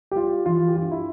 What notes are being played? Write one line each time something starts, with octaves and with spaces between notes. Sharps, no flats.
G4
G3 F4
E3 F4
G4
G2 F4
E4